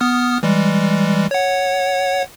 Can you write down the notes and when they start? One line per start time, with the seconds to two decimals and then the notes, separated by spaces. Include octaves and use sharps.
0.01 B3 D#6 F6
0.43 E3 G3 G#3
1.31 C#5 F#5